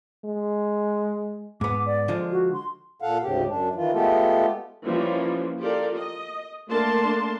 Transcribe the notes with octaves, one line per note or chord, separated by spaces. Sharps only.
G#3
G#2 B3 D6
D5
D3 F3 G#3
F#4
C6
A#2 A4 F5 F#5
D2 G#2 C#3 G4
F#2 D4
D#3 E3 F4
G#3 A3 B3 F4 G4 A4
E3 F3 G3 A#3 C#4
F4 G4 A4 A#4 D5
D#5
A3 A#3 D4 A#4 A5 C6